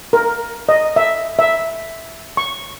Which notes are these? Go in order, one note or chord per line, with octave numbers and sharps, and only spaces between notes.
A#4
D#5
E5
E5
C#6